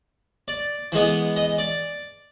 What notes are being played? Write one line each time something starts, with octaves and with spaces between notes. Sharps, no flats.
D5
E3 G#3 B3
D#5
D5